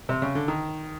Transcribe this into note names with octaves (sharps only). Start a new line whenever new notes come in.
C3
C#3
D3
D#3